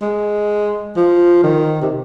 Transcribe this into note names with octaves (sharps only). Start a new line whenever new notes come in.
G#3
F3
D#3
C3